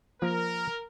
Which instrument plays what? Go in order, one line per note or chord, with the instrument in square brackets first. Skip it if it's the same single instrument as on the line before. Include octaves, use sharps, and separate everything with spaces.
[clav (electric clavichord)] F3 A#3 [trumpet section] A#4